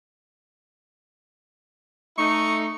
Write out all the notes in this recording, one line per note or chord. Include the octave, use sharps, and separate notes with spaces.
A3 D#4 C#6